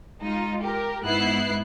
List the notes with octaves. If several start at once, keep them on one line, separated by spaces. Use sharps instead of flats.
G#3 D#4 F4
G4 A#4
G#2 B3 E4 F#6 C7